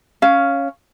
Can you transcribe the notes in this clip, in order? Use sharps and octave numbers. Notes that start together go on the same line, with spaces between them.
C#4 F5